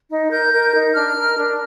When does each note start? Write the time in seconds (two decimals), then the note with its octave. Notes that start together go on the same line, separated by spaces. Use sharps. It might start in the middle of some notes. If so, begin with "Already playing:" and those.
0.10 D#4
0.30 A#4 G6
0.52 A#4
0.74 D#4
0.94 D4 F6
1.16 A#4
1.37 D4